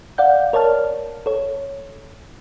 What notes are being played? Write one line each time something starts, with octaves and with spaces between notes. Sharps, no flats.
D5 F5 F#5 G6
A#4 C#5 D5 A5 F6
A4 C#5